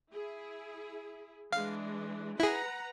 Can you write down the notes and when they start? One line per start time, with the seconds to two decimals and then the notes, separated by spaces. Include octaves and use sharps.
0.12 E4 G#4
1.52 E3 G#3 D4 F5
2.40 E4 G#4 B4 F#5 A#5